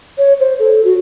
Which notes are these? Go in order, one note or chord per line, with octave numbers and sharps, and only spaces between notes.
C#5
C5
A4
F#4